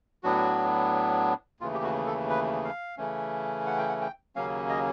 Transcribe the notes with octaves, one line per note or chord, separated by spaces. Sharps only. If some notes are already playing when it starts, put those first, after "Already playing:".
A2 F#3 B3 D4 F#4
D#2 C#3 E3 A3 F4
G4
F#4
A4
B4
F5
C#3 E3 A3 C#4
F#5
G5
F#5
G5
D#2 C#3 F#3 A#3 C#4 F5
D#5